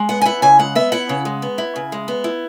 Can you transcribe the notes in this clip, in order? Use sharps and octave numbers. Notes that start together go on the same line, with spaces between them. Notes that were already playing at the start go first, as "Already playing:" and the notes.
Already playing: G#3
B3 F#5
G#5
E4 F#5
C#3 G#5
G#3 F#5
B3 E5
E4 F#5
C#3
G#3
B3
E4
C#3
G#3
B3
E4